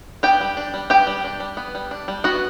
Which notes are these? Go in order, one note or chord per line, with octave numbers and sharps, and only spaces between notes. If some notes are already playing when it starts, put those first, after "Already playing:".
B3 G4 G5
G3
D4
G3
B3 G4 G5
G3
D4
G3
B3
G3
D4
G3
B3 F#4 F#5